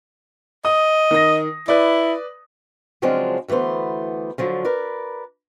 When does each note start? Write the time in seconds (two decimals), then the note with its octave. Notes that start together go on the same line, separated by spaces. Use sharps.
0.65 D#5 D#6
1.11 D#3 A#6
1.68 E4 B4 D5
3.02 C#3 F3 F#3 G#3 C4 D4
3.48 D2 E3 A3 B3 C5
4.38 D3 F3 F#3
4.65 A#4 B4 D5